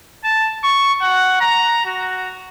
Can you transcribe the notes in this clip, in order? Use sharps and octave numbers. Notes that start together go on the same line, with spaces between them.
A5
C#6
F#5
A#5
F#4